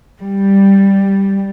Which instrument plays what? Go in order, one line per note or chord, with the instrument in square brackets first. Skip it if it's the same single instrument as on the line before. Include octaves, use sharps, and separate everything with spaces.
[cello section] G3